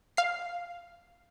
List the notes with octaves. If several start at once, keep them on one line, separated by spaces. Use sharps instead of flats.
F5 C7